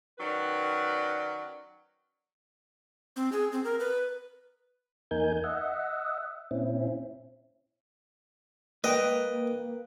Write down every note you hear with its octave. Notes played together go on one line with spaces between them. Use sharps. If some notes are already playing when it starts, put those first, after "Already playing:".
D#3 F#3 C#4 B4 D5
C4
G#4
C4
A#4
B4
E2 A#3 D#4 A#4 G#5 G6
D#5 E5 F#5
A#2 C4 C#4 E4
A#3 B4 D#5 G5